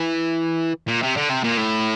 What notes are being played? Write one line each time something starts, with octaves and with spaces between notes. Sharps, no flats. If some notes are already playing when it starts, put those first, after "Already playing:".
Already playing: E3
A#2
C3
D3
C3
A#2
A2